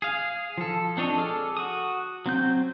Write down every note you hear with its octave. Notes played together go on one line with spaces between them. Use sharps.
G#4 F5
F3 A4
C4 D4 C#5 D#5
G#4 A4 D6 F6
F#4 D#6
F#3 C4 G6